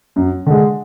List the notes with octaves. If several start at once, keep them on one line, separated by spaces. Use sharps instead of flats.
F#2
D3 G#3